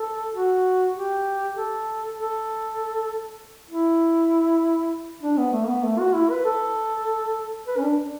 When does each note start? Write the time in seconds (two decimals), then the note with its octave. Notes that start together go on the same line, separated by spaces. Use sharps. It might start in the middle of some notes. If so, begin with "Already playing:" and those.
Already playing: A4
0.34 F#4
0.96 G4
1.56 A4
2.18 A4
3.69 E4
5.23 D4
5.37 B3
5.53 A3
5.68 B3
5.84 A3
5.99 F#4
6.14 E4
6.30 B4
6.45 A4
7.67 B4
7.77 C#4
7.82 D4